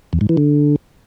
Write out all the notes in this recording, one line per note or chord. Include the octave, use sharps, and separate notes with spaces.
E2
G#2
E3
D3